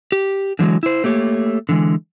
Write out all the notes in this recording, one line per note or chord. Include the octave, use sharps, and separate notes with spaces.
G4
D3 E3 F#3 G#3
E4 C5
A3 A#3 G4 C#5
D3 E3 G#3